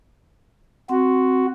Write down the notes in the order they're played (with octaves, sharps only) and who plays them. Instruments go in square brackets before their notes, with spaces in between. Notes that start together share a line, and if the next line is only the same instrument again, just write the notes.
[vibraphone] C4 [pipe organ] F#4